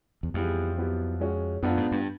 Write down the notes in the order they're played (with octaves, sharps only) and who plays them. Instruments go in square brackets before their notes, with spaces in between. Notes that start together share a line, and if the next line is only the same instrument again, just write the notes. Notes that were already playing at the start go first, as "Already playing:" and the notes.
[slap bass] E2
[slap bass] F2 [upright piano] E3 G3 B3 E4 G#4
[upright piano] F#3 B3 E4 G4
G#3 C#4 F#4
[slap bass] F#2 [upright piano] B3 D4 F4
[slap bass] G#2
G2